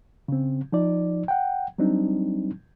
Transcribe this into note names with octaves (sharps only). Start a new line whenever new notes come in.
C#3 C4
F3 D#4 D5
F#5 G5
F#3 G3 C4 D4 D#4